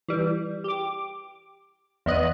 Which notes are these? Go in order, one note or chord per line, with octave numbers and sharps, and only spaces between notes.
E3 G3
G4 D6
E2 B3 D#5 F#6 D#7